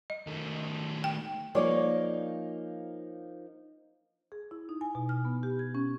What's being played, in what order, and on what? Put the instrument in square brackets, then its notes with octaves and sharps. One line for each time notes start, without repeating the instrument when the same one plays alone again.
[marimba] D#5
[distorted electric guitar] D#3 A3
[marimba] G5
[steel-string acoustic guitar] F3 A#3 D#4 [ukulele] G#4 C#5 D5
[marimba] G#4
E4
D#4
G#5
B2
F6
B3
G4
G#6
C#4